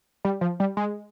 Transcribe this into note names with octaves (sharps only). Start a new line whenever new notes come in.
G3
F3
G3
G#3